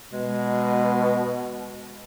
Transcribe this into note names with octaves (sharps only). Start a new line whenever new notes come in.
B2 G#3